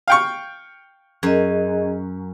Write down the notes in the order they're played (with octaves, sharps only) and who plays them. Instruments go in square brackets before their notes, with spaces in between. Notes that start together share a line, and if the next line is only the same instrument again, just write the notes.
[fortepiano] F5 G5 C#6
[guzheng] F#2 [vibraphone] G#4 D#5